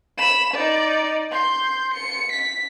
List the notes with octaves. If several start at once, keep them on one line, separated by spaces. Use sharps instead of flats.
B5 E7
D#4 D5
C6 G6
C#7
B6